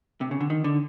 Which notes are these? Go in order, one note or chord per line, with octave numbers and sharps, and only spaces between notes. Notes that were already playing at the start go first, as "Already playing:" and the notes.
C3
C#3
D3
D#3
D3